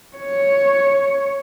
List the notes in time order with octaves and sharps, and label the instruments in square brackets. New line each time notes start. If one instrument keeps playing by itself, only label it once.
[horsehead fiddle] C#5